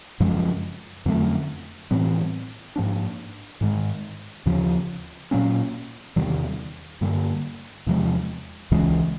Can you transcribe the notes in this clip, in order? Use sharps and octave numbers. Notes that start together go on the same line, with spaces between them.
F#2 C#3 F3 G#3
F2 D3 F#3 A3
A2 E3 G3 C4
G#2 F3 A#3 D4
G#2 D#3 G#3
D#2 C#3 F3
A#2 F#3 A#3 C#4
E2 C3 D#3 G3
G2 D3 G3 A#3
E2 C3 F3 G#3
C#2 C#3 E3 G#3